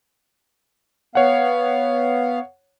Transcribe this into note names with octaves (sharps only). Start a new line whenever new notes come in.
B3 C#5 F5 F#5